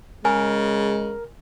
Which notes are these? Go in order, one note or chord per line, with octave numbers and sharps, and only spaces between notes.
C#3 G#3 A#4 G#5